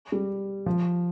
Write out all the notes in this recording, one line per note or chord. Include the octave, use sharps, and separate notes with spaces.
G3
F3